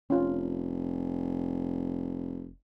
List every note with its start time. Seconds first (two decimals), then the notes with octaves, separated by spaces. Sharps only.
0.10 F1 C#4 F4